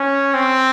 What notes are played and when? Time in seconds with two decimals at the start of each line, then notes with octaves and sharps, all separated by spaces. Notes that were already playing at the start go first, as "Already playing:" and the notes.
Already playing: C#4
0.34 C4